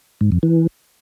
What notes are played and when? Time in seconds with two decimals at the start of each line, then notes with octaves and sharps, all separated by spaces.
0.21 G#2
0.32 F2
0.43 E3